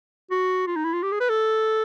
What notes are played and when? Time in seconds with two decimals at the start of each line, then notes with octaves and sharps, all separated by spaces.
0.31 F#4
0.67 F4
0.76 D#4
0.85 E4
0.94 F4
1.03 G4
1.12 G#4
1.20 B4
1.30 A4